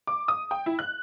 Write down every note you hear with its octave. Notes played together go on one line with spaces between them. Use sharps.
D6
D#6
G5
E4
F#6